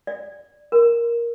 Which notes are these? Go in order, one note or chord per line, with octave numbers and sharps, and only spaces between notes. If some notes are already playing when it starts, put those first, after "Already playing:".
D5
A#4